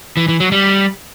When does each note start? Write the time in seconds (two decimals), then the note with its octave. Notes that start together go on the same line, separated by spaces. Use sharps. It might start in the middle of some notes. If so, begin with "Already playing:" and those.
0.17 E3
0.28 E3
0.40 F#3
0.52 G3